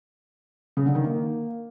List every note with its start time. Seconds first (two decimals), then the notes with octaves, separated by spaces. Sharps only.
0.77 C#3
0.86 D3
0.95 D#3
1.04 A#3